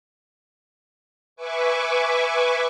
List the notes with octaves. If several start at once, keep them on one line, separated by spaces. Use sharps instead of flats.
B4 E5 G#5 C#6 D6